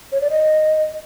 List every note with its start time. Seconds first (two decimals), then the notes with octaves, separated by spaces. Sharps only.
0.12 C#5
0.21 D5
0.30 D#5